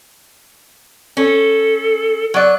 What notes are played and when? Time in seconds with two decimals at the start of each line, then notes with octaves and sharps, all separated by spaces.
1.17 C#4 A4
2.34 F#3 D5 F#6